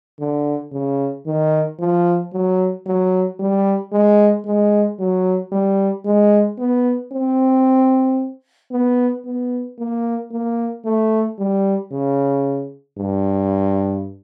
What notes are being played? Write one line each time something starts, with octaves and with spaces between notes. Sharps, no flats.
D3
C#3
D#3
F3
F#3
F#3
G3
G#3
G#3
F#3
G3
G#3
B3
C4
B3
B3
A#3
A#3
A3
G3
C#3
G2